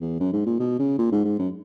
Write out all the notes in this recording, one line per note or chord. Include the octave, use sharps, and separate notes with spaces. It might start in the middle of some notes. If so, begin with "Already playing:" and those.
E2
F#2
G#2
A#2
B2
C#3
A#2
G#2
G#2
F#2